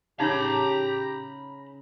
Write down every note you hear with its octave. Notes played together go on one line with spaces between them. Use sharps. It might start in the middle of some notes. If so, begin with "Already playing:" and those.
C#3 D#4 G4 C#5 A#5 B5